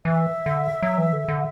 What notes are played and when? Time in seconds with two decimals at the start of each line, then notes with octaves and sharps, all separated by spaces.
0.05 E3 E5
0.46 D3
0.82 F#3
0.98 E3
1.13 D3
1.28 D3